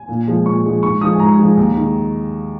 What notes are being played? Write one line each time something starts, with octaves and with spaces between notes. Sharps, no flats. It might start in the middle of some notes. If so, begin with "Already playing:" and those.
Already playing: G#5
A#2
F3 G#3
A#2 C#6
F3 G#3
G#2 C#6
F3 G#3 D#6
G#5
G#2 A#5
F3 G#3
D#2
D#3 G#3